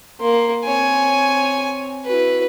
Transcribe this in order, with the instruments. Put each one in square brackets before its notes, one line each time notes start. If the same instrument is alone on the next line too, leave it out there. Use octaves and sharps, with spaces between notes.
[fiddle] A#3 [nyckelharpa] C6
[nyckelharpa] C4 C#5 [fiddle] G#5
[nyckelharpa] E4 F#4 [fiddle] B4